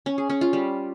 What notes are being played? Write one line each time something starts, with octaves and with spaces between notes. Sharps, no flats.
C#4
G#4
C#4
F4
G3